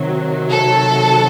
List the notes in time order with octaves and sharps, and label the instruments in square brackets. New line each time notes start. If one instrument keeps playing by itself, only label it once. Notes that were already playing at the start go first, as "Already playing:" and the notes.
Already playing: [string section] C3 D#3 F#3
A4